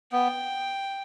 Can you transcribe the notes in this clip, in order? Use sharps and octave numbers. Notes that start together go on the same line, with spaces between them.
B3 G5